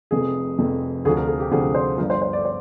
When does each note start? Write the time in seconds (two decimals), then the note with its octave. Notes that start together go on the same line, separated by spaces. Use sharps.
0.11 F1 F2 C3 G#4
0.58 F1 F2 C3
1.05 D2 C3 F3 G#4
1.17 A#4
1.27 G#4
1.40 G4
1.51 D2 C3 F3 G#4
1.75 C5
1.98 G1 G2 F3 A#4
2.10 C5
2.22 C5
2.33 D5
2.45 C5